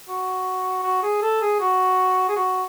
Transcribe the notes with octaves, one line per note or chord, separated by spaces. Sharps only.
F#4
F#4
G#4
A4
G#4
F#4
G#4
F#4